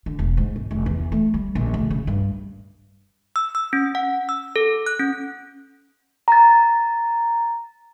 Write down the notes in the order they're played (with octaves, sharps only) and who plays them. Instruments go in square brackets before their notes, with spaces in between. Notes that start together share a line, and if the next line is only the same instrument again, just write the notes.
[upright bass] D3
E1
G#2
G1
F1
E2
A3
G3
A#1
D2
C#3
G2
[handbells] E6
E6
C#4
F#5
E6
A4
F#6
C#4
[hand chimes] A#5 A6